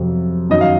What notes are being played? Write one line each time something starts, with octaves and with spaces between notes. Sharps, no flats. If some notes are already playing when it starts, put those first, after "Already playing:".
Already playing: F2 C3 F#3
F#2 D#3 F#3 D#5
F5